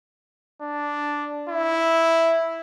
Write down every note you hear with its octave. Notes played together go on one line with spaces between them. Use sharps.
D4
E4